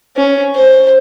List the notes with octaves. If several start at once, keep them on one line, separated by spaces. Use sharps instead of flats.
C#4
C5